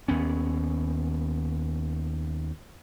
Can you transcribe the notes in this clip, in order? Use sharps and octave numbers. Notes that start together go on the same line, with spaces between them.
D#2 B3 C#4